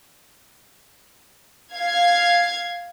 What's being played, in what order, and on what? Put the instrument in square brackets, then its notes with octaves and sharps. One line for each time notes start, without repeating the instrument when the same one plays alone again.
[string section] F5 G#6